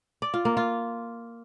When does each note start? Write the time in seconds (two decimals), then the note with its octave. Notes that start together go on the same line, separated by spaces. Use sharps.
0.22 D5
0.34 F4
0.45 A#3
0.57 F4